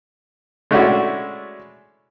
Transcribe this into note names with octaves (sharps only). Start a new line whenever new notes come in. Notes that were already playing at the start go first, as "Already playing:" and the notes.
G#3 A3 C#4 D4 E4 F#4